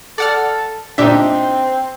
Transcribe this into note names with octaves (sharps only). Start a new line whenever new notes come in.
A4 D5 F#5 F6
A#2 C4 D4 D#4 G4 E5